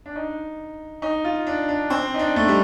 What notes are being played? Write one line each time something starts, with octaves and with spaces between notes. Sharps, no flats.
D4
D#4
D#4
F4
D4
D4
C4
D#4
D4
A3
G3